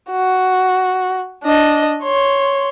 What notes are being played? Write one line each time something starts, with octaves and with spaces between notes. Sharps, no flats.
F#4
D4 D#5
C#5 C6